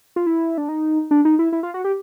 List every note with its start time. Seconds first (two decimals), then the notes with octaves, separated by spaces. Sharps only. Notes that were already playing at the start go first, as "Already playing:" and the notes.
0.16 F4
0.27 E4
0.58 D4
0.69 D#4
1.11 D4
1.25 D#4
1.39 E4
1.52 E4
1.63 F4
1.74 F#4
1.84 G4